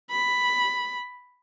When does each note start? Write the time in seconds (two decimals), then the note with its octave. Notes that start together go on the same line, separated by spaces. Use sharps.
0.11 B5